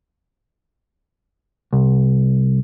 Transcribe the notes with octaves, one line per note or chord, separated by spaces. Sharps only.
C2